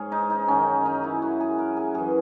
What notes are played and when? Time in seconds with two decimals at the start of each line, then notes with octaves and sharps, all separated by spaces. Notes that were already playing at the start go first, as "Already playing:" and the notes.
Already playing: G#2 C#4 G#4
0.12 D#4
0.30 D#4
0.48 F#2 D#3 F#3 C#4
0.85 D#4
1.04 E4
1.22 F#4
1.40 G#4
1.59 A#4
1.77 G#4
1.94 F#2 E3 G#4